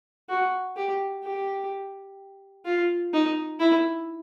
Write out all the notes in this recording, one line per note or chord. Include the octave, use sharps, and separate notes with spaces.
F#4
G4
G4
F4
D#4
E4